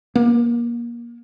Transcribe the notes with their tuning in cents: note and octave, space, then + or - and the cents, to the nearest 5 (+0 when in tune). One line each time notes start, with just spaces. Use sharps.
A#3 +25